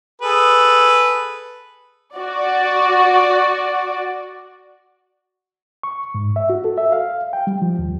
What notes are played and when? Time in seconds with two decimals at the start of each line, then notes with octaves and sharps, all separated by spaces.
0.22 G#4 A4 B4
2.16 F#4 D5
5.83 C#6
6.15 G#2
6.36 E5
6.50 F#4
6.65 A4
6.78 E5
6.92 F5
7.33 G5
7.47 G3
7.62 F3
7.79 D#2